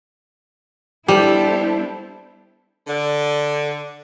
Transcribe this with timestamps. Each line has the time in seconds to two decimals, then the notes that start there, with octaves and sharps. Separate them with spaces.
1.08 G3 B3 D4 E4 G4 A4 C5
2.87 D3